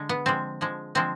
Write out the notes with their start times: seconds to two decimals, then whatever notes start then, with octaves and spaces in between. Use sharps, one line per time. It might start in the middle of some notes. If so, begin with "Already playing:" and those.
Already playing: D3 G#3
0.09 B3
0.26 D3 F3 G#3 C4
0.61 D3 F3 G#3
0.95 D3 F3 G#3 C4